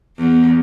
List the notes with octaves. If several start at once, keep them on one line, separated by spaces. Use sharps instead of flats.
E2